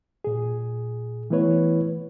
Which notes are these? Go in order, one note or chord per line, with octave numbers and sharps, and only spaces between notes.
A#2 G#4
E3 A3 B3 E4 B4 C#5